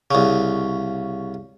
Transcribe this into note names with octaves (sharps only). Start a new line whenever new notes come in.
C2 C#3